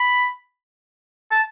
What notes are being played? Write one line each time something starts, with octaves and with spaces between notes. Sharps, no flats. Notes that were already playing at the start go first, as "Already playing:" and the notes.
Already playing: B5
A5